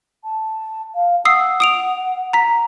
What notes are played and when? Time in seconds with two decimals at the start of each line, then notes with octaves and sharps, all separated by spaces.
0.24 A5
0.95 F5
1.25 F#5 D#6 E6 C7
1.60 D#6 D7 F7
2.33 A#5 B6